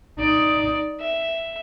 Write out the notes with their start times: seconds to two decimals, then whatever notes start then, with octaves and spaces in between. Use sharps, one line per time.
0.19 D#4 D5
1.00 E5